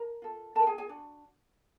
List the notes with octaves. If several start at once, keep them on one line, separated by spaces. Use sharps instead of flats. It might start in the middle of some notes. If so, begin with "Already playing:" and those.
Already playing: A#4 A#5
F4 A4
F4 A4 A#4 A5
G5
G#4 G#5
G#4 G#5
D4 F#4